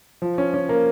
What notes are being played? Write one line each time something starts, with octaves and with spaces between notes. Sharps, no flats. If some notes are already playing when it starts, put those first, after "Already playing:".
F3
C#4
C#4
A#3